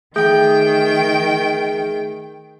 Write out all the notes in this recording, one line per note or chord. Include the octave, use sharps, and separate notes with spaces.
D#3 A3 G#4 G5 G6